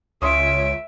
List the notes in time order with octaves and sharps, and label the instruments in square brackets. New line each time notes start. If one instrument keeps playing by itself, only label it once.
[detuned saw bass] C#2 [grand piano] C#4 C6 D#6 [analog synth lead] C#5 [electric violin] E5 D7